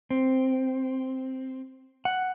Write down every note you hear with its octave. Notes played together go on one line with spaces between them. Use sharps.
C4
F#5